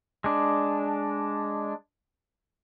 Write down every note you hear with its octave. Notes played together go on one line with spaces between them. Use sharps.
G#3 D4